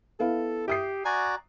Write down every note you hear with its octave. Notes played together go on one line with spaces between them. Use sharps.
B3 E4 A4 F5
G4 E5 D#6 C7
F#4 D5 G#5 A#5